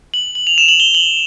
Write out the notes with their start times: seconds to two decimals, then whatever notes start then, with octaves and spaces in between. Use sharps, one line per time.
0.14 F#7
0.35 F#7
0.47 F7
0.58 E7
0.68 F#7
0.80 G7
0.94 F#7